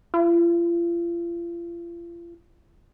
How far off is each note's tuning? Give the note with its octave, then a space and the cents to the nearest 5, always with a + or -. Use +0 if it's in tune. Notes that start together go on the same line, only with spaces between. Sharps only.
F4 -40